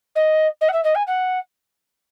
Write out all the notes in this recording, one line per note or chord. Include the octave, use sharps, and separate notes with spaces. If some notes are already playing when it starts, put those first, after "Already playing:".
D#5
D#5
F#5
E5
D#5
G#5
F#5